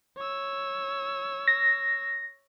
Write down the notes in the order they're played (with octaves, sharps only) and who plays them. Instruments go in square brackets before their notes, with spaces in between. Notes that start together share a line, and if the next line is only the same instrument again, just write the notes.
[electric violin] C#5 E6
[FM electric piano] A#6